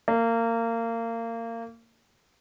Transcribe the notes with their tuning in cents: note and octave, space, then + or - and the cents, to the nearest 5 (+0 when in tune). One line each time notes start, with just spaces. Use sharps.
A#3 -25